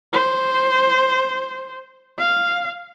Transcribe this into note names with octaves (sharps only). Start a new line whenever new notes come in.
C5
F5